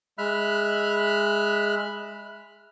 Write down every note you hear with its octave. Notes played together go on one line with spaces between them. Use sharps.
G#3 E5 B5 F6 F#6